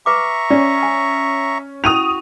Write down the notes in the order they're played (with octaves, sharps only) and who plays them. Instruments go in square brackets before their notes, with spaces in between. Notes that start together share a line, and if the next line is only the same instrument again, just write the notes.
[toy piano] B4 D6 [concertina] E5 A#5 C#6
[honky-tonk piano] C#4 [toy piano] D5
[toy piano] G#5
[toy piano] C#4 E4 [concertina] F#4 [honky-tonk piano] D#6 D#7 F7